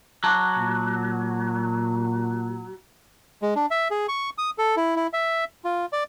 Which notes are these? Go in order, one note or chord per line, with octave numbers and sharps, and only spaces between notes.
F#3 A5 D6 F#6
A#2
G#3
D4
E5
G#4
C#6
D#6
A4
E4
E4
E5
F4
D5